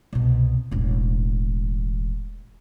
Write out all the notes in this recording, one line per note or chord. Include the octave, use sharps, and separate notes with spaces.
C2 B2
E1 A1